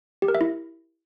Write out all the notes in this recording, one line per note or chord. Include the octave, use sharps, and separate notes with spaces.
G4
A#4
E5
E4